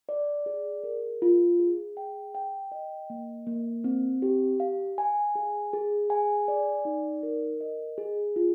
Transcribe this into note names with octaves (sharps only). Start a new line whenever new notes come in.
D5
G#4
A#4
F4
G#4
G5
G5
D#5
A#3
A#3
C4
G4
F5
G#5
G#4
G#4
G#5
D5
D#4
A#4
D#5
G#4
F4